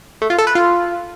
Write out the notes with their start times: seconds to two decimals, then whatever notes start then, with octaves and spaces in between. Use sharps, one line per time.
0.22 A3
0.30 F4
0.38 A4
0.47 B4
0.55 F4